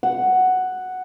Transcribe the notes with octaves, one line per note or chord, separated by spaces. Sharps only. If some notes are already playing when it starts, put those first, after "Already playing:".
F#5